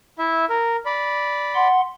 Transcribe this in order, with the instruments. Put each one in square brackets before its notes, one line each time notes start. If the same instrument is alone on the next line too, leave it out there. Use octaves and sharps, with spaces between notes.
[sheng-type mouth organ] E4 E5
A#4
D5 B5
[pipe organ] F#5 C6